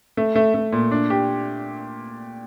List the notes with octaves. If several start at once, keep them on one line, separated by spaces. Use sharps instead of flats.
A3
A3
A3
A#2
D4
G4